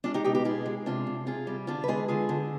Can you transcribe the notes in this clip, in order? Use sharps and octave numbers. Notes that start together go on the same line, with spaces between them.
G#3 D4 F4
D#4 G4
B2 D#4 G4
G4 B4
G#3 F4 G#4
G#3
C3 D4 F4
C3
C3 F4 G#4
G3
D3 D4 F4
B4
G#3 F4 G#4
D3 F4 G#4
D3